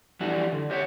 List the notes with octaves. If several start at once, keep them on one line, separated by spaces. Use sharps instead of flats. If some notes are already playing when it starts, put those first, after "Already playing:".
F2 E3 G3 D4 F#4
D3
G4 C5 C#5 E5 F#5